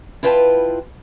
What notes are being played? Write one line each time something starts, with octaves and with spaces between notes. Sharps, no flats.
E4 F4 B4 G5 A5